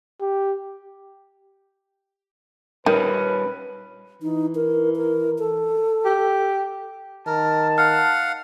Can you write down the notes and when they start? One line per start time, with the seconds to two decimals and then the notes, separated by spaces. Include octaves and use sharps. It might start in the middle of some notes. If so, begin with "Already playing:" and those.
0.21 G4
2.86 D#3 G3 C#4 B4
4.22 E3 D#4
4.55 A#4
4.96 A#4
5.39 A4
6.05 G4
7.27 D#3 A#4 A5
7.78 F5 F#5 F6